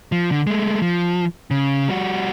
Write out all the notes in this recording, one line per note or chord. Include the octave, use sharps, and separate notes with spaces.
F3
D3
G#3 A3
F3
C#3
G3 F#4